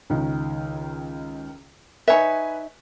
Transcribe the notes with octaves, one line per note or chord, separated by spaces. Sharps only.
C#2 D#3
D#4 B4 C#5 E5 G#5